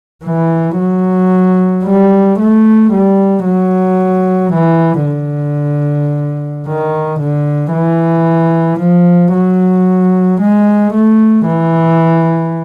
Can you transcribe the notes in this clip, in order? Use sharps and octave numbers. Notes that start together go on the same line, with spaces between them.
E3
F#3
G3
A3
G3
F#3
E3
D3
D#3
D3
E3
F3
F#3
G#3
A3
E3